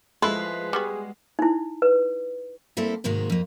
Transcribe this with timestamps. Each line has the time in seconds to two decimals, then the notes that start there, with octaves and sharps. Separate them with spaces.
0.22 F3 G#3 A3 E4 B4 C6
0.73 G3 B3 F#4 G#4
1.39 D#4 E4
1.82 B4
2.77 G3 A#3 C4 E4 A4
3.04 G#2 C3 D#3 G#3 A#3 F#4
3.30 F2 A#3